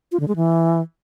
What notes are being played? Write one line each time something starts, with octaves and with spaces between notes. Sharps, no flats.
F4
D3
G#3
E3